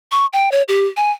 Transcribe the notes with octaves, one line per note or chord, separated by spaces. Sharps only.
C#6
G5
C#5
G4
G#5